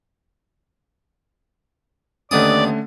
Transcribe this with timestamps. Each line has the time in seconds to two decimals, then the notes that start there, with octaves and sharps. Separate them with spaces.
2.31 D#2 D3 A3 B3 C#4 D5 D#6